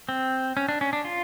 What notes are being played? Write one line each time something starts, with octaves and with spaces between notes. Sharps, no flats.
C4
C#4
D4
C#4
D4
F4